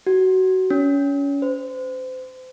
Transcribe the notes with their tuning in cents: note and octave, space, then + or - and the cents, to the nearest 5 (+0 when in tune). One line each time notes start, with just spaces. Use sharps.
F#4 +20
C#4 +25
C5 -35